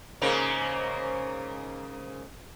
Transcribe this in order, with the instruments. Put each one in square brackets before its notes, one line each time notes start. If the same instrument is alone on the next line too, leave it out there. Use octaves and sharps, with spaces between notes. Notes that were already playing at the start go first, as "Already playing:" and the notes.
[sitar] G#2 C#3 A#3